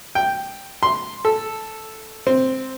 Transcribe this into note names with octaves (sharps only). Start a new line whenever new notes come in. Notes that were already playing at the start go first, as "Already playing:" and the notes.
G5
C6
A4
C4